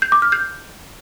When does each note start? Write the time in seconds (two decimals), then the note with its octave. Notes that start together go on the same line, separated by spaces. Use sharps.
0.02 G6
0.12 D6
0.22 F6
0.32 G6